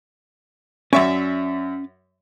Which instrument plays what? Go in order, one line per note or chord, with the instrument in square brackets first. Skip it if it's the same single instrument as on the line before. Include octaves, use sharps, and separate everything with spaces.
[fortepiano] F#2 E5 C#6 [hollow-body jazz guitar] C#4 D5 G#5